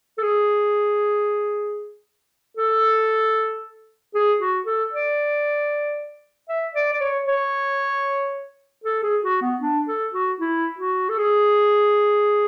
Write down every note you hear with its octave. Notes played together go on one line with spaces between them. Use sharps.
A4
G#4
A4
G#4
F#4
A4
D5
E5
D5
D5
C#5
C#5
A4
G#4
F#4
B3
D4
A4
F#4
E4
F#4
A4
G#4